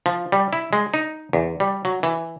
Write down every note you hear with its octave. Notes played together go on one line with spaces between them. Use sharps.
F3
G3
E4
G#3
D#4
E2
G3
F#3
E3